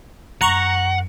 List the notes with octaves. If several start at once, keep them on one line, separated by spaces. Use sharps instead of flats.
F#2 F#5 A#5 C#6